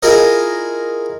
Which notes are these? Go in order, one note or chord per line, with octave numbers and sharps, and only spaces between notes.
E4 F4 G#4 A#4 D#5